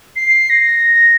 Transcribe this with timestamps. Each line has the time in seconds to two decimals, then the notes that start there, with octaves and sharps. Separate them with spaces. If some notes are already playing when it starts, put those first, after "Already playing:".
0.16 C7
0.50 A#6